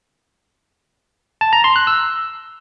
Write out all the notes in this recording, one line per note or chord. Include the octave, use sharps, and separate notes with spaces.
A5
A#5
C6
F#6
E6